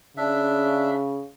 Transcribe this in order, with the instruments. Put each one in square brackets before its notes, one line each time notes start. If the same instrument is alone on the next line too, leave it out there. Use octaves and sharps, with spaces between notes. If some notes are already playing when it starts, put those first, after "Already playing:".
[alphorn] C#3 [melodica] D4 E5